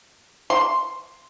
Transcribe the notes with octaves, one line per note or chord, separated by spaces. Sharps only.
C6